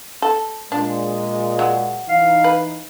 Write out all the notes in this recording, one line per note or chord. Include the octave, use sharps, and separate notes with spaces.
A4
A#2 G#3 D4
F#3
E3 D#4 F5
B4